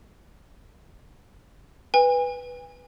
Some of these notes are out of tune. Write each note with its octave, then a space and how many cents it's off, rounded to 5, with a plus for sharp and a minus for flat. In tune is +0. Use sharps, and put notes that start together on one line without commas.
B4 +0 G#5 -35